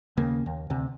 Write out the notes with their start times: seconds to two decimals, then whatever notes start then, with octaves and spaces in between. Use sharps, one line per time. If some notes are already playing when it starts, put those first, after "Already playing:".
0.17 D#2 C#3 A#3
0.46 D#2
0.70 D2 C3